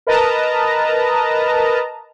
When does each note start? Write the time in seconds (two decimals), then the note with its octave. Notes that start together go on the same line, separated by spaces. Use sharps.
0.07 A#4 B4 D#5 A5 A#5